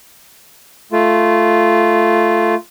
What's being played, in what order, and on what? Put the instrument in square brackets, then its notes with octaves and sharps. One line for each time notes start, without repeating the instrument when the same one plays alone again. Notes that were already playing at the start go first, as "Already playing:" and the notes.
[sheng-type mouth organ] A3 F4